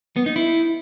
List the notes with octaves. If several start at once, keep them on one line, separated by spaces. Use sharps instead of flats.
B3
D#4
E4